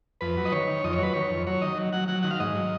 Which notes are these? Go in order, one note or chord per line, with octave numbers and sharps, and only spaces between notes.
F2 B4
F#3
D#5
D#3 C#5
D#3
F2 D#5
C#5
F#3 B4
D#3 C#5
F2
F#3 C#5
D#3 D#5
F#3
F#3 F#5
F#3 F#5
D#3 F#5
F5
G#2 D#5
F#3